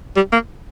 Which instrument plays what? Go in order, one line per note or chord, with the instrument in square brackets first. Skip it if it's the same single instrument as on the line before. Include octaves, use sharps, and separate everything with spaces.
[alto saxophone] G3
A#3